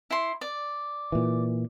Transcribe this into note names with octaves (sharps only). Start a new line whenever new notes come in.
E4 C6
D5
A#2 E3